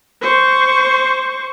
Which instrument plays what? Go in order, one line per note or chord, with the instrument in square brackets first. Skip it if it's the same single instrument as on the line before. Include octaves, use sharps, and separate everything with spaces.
[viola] C5 C#6